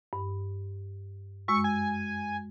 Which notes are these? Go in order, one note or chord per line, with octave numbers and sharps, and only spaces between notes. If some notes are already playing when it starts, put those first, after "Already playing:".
G2
F#2 G#3 C#6 E6
G#5